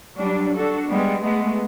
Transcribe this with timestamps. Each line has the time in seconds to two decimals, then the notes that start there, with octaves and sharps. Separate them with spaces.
0.15 F#3 G3 D4
0.55 D4 F#4 A4
0.88 G3 G#3 B3
1.22 G#3 A3 B3